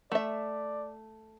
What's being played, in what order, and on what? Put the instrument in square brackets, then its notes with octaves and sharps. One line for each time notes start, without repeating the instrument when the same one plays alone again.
[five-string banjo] A3 E5 [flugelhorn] D5